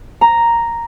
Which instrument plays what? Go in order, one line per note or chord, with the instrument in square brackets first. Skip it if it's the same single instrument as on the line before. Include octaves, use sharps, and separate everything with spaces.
[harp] A#5